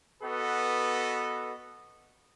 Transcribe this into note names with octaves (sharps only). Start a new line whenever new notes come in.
B3 F#4 A4 B4 D#5